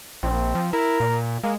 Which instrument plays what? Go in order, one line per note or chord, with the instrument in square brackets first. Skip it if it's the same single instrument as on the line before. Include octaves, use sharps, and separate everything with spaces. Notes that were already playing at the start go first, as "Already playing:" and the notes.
[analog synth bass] A#1 [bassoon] C4
[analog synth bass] F3
[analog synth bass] E4 [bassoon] A#4
[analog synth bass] A#2
[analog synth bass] G#3 [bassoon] A#3